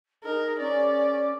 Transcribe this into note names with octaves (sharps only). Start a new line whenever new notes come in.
D#4 G#4 A#4
C#4 D5